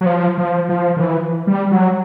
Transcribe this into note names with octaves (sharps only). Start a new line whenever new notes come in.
F#3
F3
F3
F3
D#3
E3
G3
F#3